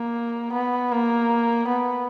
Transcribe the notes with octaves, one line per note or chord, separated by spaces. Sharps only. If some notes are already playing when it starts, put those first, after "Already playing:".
Already playing: A#3
B3
A#3
B3